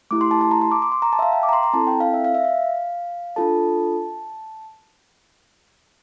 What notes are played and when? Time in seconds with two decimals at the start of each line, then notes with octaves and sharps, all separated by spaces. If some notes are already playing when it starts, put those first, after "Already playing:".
0.11 A3 E4 G4 D6
0.21 C6
0.31 A5
0.41 A5
0.51 A#5
0.62 C6
0.72 D6
0.82 D6
0.92 C6
1.02 A#5
1.13 A5
1.19 E5
1.22 F5
1.33 G5
1.43 D6
1.49 A#5
1.53 C6
1.63 A#5
1.73 C4 E4 A4 A5
1.87 G5
2.00 F5
2.14 E5
2.24 F5
2.34 E5
2.45 F5
3.36 D4 F4 A4 A5